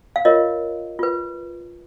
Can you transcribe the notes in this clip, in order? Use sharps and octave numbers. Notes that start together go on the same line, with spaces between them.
F5
F4 A#4 C#5 D#5
F4 B4